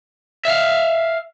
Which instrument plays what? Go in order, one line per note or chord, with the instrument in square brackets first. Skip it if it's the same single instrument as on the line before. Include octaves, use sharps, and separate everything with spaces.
[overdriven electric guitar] E5 F5